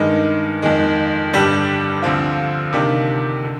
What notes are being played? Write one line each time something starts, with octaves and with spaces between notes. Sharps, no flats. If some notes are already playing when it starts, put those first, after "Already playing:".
Already playing: G2 D#3 G#3
F2 D#3 G#3
G2 D3 G3 D4 G4
D2 D3 F3 C4 F4
C3 D#3 A#3 D4 G4
D3